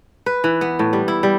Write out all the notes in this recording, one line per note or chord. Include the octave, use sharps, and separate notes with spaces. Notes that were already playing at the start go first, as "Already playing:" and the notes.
B4
E3
B3
A2
G3
E4
G3